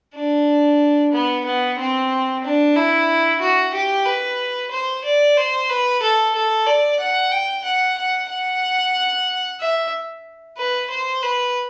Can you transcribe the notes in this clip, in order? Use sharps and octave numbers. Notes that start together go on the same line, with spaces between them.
D4
B3
B3
C4
D4
E4
F#4
G4
B4
C5
D5
C5
B4
A4
A4
D5
F#5
G5
F#5
F#5
F#5
E5
B4
C5
B4